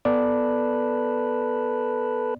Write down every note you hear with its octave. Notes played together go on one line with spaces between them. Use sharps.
B3 A4 B4 D5